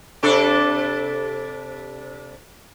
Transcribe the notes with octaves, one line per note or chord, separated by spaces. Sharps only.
C3 D4 A4